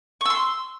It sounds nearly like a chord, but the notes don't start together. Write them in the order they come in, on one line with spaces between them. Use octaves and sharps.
C#6 E6 C6